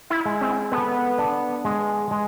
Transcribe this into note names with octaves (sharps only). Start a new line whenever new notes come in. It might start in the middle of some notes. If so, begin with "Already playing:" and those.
E4
G#3
C4
B3 A4
D4
G#3
G#3